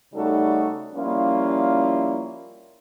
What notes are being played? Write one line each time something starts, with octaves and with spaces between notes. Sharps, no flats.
C#3 G3 A3 D#4 F#4 A4
F3 G3 A#3 C#4 E4 F4